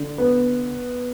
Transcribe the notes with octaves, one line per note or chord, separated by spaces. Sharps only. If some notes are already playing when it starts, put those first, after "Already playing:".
Already playing: D3
B3